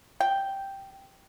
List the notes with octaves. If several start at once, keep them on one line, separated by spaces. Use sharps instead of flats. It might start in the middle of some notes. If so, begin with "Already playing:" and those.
G5